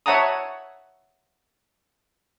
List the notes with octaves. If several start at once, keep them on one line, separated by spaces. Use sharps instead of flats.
C#5 E5 F#5 A5 A#5 D#6